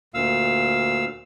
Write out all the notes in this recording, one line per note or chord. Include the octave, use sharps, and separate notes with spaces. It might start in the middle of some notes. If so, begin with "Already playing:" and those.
D2 A#2 F5 E6